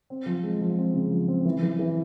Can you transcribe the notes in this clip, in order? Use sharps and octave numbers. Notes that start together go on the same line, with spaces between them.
C4
F3
G#3
F3
C4
C#3
F3
C4
E3
E3
E3